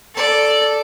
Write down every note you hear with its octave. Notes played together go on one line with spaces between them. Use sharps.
A4 D5